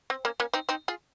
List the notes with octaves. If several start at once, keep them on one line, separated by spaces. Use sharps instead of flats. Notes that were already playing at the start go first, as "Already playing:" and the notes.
C4
A#3 C#4
A#3 C#4
C4 D#4
C4 D#4
F4 G#4